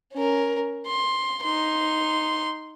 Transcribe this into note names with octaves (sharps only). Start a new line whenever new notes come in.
C#4 A#4
C6
D#4 C6